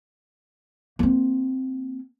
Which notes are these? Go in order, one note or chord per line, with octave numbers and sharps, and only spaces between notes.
A#3 C4